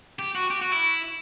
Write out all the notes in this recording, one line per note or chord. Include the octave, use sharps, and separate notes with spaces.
G4
F#4
G4
F#4
E4